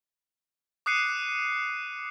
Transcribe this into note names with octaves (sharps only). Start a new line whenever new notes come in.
D6 D#6 F#6 C7 C#7 D#7